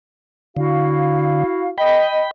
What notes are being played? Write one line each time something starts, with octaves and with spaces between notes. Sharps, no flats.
D3 E4 F#4 F5
D#5 G5 B5